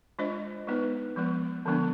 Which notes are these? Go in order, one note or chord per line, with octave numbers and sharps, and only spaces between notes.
G#3 D4 F4 C5 D#5
G#3 B3 D#4 B4
F3 G#3 B3
D3 F3 G#3 B3 D4